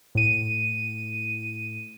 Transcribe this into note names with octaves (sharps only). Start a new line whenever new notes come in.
A2 D#7